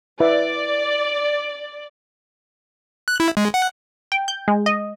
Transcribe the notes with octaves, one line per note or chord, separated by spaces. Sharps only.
E4 B4 D5 E5
F#6
E4
G#3
F#5
G5
G6
G#3
D#5